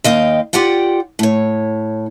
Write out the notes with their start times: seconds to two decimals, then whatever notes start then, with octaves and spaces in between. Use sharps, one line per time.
0.04 D#2 D#5 F5 G5
0.53 F4 G4 D5 F#5 G5
1.19 A2 C#5